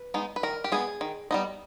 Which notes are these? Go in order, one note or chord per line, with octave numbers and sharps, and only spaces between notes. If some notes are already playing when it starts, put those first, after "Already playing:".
Already playing: B4
G#3 B3 D#4
B4
D#3 A#4
G4
G#3 B3 G#4
D#3
G3 B3 D#4